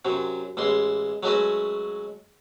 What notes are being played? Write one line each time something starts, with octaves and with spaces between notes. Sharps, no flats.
F#2 C3 F#3
A1 E3 G#3 C6
F#3 G#3 A3 C#4 F#4 B4